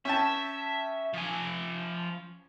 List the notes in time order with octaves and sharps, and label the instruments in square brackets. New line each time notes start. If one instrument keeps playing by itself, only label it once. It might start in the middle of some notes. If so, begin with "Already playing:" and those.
[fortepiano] C#4 G5 A5 [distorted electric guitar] E5
[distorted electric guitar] F3 G#5